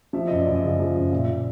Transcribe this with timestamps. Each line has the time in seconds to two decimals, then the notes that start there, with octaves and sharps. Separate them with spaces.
0.13 F3 E5
0.28 F#2 D#5
0.40 D5
0.47 F#2
0.55 D#5
0.63 C#3
0.79 F3
0.96 F#2
1.12 A#2 E5
1.29 A#2